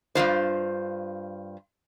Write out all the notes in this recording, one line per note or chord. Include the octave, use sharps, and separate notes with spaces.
G2 E3 F4 C5